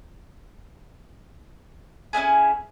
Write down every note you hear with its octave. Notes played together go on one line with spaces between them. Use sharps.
C#4 D#4 E4 G#4